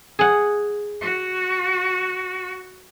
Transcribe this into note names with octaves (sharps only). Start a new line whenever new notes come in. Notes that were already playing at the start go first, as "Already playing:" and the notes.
G#4 F#5
F#4